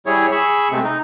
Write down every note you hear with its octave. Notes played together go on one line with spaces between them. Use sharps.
G3 E4 G#4 C#5
G#4 B5 C#6 E6
C3 G#3 A3 C4
D#4